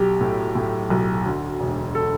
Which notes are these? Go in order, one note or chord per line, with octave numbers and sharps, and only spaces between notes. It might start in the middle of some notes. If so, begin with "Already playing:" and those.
Already playing: B1 G4
A2
A2
B1
D2
E1
A4